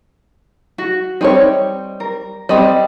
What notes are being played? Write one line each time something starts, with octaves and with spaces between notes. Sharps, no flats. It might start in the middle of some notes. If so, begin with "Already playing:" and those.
F#4
G3 C4 D#4 C#5
A#4
G3 C4 D#5